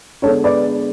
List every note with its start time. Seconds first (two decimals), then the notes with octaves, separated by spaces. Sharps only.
0.22 D3 G#3 B3 D4 A4 C#5
0.44 B4 D5